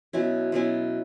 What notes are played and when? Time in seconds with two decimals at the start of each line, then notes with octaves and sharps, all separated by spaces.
0.13 B2 F#3 C#4 E4
0.52 B2 F#3 C#4 E4